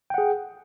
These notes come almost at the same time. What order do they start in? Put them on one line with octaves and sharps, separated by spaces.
G5 F#5 G#4